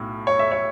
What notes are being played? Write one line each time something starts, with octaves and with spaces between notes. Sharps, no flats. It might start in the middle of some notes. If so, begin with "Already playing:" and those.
Already playing: B1 A2
C#5
E5
C#5